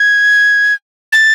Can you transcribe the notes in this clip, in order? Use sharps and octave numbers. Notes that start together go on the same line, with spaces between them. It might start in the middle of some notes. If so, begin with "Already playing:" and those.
Already playing: G#6
A6